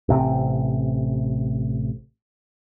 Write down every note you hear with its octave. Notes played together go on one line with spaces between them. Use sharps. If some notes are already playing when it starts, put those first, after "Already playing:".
A1 C3 D#3 C4